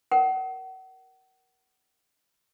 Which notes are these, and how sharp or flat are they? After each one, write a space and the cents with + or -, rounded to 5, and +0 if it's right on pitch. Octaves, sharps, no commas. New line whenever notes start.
A#4 +5 F#5 +35